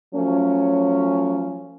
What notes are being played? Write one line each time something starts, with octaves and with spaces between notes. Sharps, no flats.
F3 F#3 A3 C#4